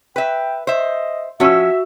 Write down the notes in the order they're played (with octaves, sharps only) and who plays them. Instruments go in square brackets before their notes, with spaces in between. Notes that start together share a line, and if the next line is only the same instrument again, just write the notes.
[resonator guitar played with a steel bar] B4 E5 [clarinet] G5
[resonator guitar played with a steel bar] C5 E5 [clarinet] D#5
[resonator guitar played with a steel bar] F3 C#4 [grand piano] F#4 E6 [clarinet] E5